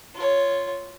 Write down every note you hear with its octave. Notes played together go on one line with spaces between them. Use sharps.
F4 C#5